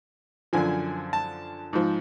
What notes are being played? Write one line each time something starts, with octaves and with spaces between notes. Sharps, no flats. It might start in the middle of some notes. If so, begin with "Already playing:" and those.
F#2 D3 F3 G#5
A5
G#2 F3